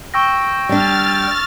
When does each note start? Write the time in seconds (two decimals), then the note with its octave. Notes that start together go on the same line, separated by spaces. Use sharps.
0.14 G5 C#6 E6 A#6
0.69 G3 D4 F6 A6